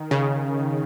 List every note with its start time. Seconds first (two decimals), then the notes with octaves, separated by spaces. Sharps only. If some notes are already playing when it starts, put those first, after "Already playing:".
Already playing: D#3
0.11 C#3